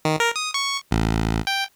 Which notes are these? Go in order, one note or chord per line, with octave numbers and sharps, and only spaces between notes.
D#3
A#4
D#6
C#6
A1
G5